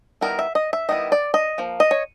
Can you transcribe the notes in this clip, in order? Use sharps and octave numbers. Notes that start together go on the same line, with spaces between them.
D#3 G3 B3 E4 A#4
E5
D#5
E5
D#3 G3 B3 E4 D#5
D5
D#5
F3 A#3
D#5
C#5